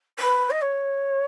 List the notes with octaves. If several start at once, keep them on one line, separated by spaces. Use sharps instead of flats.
B4
D#5
C#5